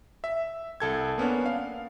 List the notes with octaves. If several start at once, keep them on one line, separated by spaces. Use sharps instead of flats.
E5
C2 A4 G#6
A#3 B3 C#4 D4
F5